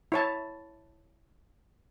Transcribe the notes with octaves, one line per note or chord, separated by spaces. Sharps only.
E4 C#5 A5